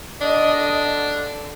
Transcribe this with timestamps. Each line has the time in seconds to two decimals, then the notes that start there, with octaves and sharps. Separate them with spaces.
0.22 D3 D4 D#5